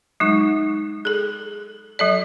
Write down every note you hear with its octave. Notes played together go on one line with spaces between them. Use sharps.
F#3 G#3 D#4
G#4 A4
F#3 A4 D5